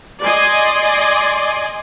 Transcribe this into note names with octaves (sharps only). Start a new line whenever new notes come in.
D5 D#5 G#5 C6